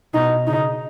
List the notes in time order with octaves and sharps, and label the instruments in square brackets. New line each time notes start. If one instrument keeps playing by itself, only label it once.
[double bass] B2 [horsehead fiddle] D#4
[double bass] C#3 [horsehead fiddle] D#4